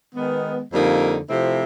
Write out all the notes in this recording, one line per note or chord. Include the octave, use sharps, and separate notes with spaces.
D#3 G#3 B3
F2 D3 G3 A#3 D#4
C3 F3 A3 C4 E4